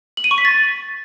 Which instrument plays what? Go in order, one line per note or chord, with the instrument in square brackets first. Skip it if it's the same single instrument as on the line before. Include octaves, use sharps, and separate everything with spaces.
[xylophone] F#7
D#7
C#6
B6
A6